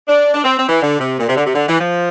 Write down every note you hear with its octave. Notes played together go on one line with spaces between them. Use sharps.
D4
D4
C4
C4
E3
D3
C3
A#2
C3
D3
C3
D3
E3
F3